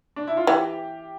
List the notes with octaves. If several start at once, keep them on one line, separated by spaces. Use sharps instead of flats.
D4
E4
F4
E3 G4